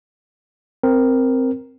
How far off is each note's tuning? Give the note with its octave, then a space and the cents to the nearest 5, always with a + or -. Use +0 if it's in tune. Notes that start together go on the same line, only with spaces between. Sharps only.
C4 +0 A#4 +0